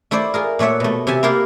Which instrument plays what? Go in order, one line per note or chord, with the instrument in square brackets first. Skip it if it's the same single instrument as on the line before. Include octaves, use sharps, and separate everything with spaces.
[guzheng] A3 E4 C5 D5
F4 G#4 A#4
A#2 A3 C#5 E5 F#5
B2 A3
C3 G4 E5 G#5 A5
A#3 E4 F4 G4 A#4 F5